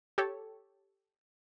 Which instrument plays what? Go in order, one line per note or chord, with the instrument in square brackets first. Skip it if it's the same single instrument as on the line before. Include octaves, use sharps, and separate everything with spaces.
[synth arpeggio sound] G4 A4 C#5